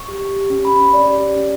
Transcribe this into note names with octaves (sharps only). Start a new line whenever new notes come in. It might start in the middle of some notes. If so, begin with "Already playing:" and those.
Already playing: C#6
G4
G4
G4
C#4
C#4 B5
C#4
C#4 D5
G4
C#4
C#4